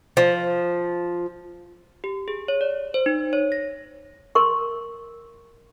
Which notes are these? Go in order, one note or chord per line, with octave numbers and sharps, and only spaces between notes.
F3
G4
G#4
C#5
D5
C5
D#4
C#5
A#6
A#4 C6 C#6